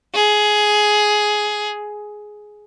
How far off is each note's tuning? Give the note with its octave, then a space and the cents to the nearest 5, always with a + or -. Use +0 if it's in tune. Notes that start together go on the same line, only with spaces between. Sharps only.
G#4 +10